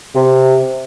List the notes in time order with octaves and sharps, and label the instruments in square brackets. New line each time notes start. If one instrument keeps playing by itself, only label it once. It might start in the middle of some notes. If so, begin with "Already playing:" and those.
[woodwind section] C3